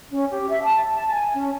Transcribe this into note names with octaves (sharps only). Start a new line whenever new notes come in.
C#4
G4
E5
A5
A5
G#5
C#4